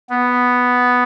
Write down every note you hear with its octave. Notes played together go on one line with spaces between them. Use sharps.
B3